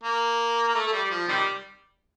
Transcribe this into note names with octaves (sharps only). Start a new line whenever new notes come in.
A#3
A#3
A3
A3
G3
G3
F3
C3 D#3 G3